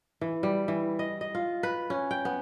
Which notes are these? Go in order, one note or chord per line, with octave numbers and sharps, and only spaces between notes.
E3
G3
E3
D#5
D#5
F4
B4
C#4
G5
B3